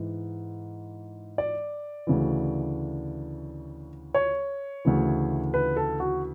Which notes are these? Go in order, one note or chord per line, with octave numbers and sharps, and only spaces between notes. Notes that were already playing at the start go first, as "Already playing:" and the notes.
Already playing: G#2 E3
D5
D2 C#3 E3
C#5
D2 C#3 E3
B4
A4
F#4